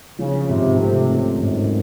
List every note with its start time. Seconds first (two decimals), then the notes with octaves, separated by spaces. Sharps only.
0.18 C#3 F3
0.48 G#2 C3
0.78 C3 A3
1.08 F#2 C4
1.38 G#2